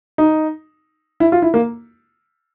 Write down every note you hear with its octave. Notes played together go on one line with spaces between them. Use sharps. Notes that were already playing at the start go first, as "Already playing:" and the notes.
D#4
E4
F4
E4
A#3